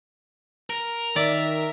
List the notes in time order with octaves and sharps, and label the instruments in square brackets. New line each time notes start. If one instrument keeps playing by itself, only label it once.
[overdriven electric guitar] A#4
[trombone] D#3 [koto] D5 [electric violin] E5